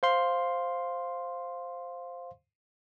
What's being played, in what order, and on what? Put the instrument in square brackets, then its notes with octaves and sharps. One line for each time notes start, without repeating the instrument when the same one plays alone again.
[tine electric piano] C5 F5 C6